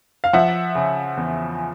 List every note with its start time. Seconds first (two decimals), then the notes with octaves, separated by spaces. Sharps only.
0.24 F5
0.33 F3 E5 F#5
0.75 C#3
1.17 E2